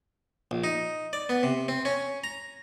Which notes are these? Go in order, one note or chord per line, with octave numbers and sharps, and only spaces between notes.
A#1
D#4
D5
B3
C3
C4
C#4
A#5